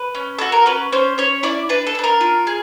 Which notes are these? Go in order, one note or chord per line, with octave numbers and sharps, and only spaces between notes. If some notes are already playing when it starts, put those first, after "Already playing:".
Already playing: B4
C#4
F#4 A4
A#4
C#4 B4
C#4 C5
C#4 C#5
E4 D5
D4 B4
A4
D4 B4
A#4
F4
G#4